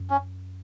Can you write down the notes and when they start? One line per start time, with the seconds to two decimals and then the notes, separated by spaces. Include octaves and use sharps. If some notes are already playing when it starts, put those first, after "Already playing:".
Already playing: F#2
0.10 C#4